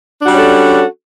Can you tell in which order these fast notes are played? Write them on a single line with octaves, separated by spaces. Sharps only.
D4 F#4 G3 C#4 A4